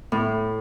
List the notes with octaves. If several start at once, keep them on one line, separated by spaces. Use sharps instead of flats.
A2